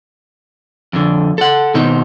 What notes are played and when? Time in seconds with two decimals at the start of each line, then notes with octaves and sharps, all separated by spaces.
0.93 F2 D3
1.38 A4 F#5
1.74 B2 D#3 C4 D#4